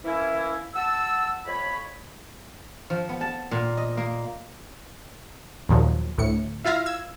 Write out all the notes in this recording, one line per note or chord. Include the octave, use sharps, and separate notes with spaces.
E3 A#3 C#4 E4
F#5 A5 E6
F2 C#5 B5
F3
B3
A5
A#2
D#5
A#3
D#2 A#2 F3 F#3
D2 A2 C#7
E4 F4 E5 F5 A#6
E6 G#6